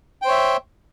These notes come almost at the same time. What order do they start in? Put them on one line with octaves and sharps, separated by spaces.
G5 C5 C#5 E5